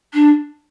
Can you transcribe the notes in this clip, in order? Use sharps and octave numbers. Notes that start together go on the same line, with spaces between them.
D4